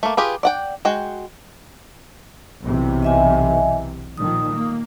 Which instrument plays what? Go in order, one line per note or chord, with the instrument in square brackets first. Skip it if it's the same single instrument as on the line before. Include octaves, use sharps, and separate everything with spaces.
[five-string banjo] A3 A#3
F4 G4 G#4 B4
D5 F#5 G5
G#3 F#4 G5
[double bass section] B1 C3 E3
[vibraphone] D#5 E5 G#5
[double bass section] A#2 D#3 F3 [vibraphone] D#6
[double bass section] A#3